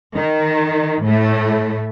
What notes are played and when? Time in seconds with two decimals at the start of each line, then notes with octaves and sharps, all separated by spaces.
0.15 D#3
1.04 A2 A3